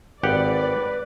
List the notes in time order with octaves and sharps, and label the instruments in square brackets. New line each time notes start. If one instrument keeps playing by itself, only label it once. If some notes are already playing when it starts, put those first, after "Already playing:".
[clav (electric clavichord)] G#1 G4 F#5 [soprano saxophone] B4 [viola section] D5